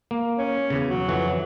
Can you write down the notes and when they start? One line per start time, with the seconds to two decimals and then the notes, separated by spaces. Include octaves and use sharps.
0.11 A#3
0.38 C#4
0.70 E2 C#3
0.88 F#3
1.09 F2 E3 F#4